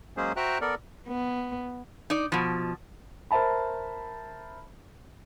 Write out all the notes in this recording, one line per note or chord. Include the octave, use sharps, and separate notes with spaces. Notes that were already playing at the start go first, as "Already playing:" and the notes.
F#3 G#3 A#3 C#4 G#4 C5
F#4 C5 E5 G5 A#5 F#6
B3 A4 A#4 D5
B3
D#4 D5
B2 F3
A#4 C5 E5 A5 B5